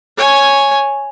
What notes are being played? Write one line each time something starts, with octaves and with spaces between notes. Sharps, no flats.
C#5 G#5